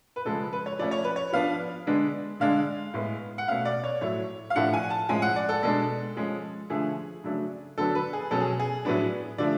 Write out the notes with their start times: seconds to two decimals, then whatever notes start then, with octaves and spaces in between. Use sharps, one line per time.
0.16 B4
0.25 C#3 F3 G#3 A4
0.53 B4
0.66 C#5
0.79 F3 A3 C#4 D5
0.91 C#5
1.04 B4
1.16 C#5
1.33 F3 B3 D4 F5
1.86 D3 G#3 B3 D4
2.40 D3 G#3 D4 F5
2.94 A2 G#3 B3
3.38 F#5
3.48 B2 A3 C#4 F5
3.65 D5
3.84 C#5
4.01 A2 F#3 A3 C#5
4.50 F5
4.56 A2 F3 A3 D4 F#5
4.73 G#5
4.90 A5
5.09 A2 F3 G#3 C#4 G#5
5.22 F#5
5.36 D5
5.49 A4
5.62 B2 G#3 D4 A4
6.16 F3 G#3 C#4
6.70 D3 F3 A3 G#4
7.24 C#3 F#3 A3 D4
7.78 D3 F#3 B3 D4 A4
7.95 B4
8.13 G#4
8.31 B2 F#3 C#4 A4
8.40 G#4
8.60 G#4
8.85 A2 F#3 B3 D4
9.38 D3 F3 A3 D5